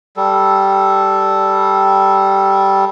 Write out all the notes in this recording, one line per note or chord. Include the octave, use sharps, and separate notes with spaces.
G3 A4